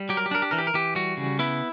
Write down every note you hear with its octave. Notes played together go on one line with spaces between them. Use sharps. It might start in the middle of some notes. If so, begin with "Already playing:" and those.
Already playing: G3
F#3 G4
A#4
G4
D4 A#4
G4
E3 A#4
G4
A#4
E3 G4
G3 F#4
C#3
B3 E4